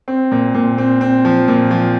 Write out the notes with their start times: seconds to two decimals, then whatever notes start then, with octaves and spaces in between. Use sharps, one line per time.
0.08 C4
0.31 A#2
0.54 A#2
0.78 C4
1.01 C4
1.25 F3
1.48 A#2
1.71 F3